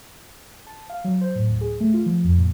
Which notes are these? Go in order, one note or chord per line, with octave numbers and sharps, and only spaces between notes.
A5
F5
F#3
C5
A2
D2
G#4
A3
F4
F3
F2
A#2